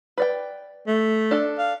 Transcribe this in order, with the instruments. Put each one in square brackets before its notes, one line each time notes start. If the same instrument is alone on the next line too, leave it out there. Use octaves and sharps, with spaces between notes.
[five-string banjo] B4 D5 G5
[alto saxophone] A3
[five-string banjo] D4 A4
[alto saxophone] F5